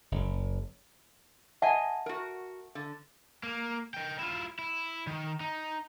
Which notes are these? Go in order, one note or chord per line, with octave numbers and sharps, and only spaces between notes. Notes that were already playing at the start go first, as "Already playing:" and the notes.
F#1
D#5 E5 F#5 G#5 A5
F#4 A#4
D3
A#3
D#5 G5
E4 F4
E4
D#3
D#4